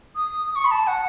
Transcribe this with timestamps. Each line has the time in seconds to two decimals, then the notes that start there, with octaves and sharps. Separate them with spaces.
0.16 D#6
0.56 C#6
0.65 B5
0.71 A5
0.87 F#5